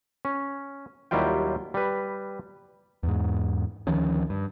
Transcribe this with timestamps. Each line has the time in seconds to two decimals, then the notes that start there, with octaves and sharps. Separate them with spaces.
0.25 C#4
1.11 D#2 F#3 G3 E4 F4 G5
1.74 G3 B4
3.03 E2 G#2
3.87 D2 D#3 F3 C#4
4.30 G2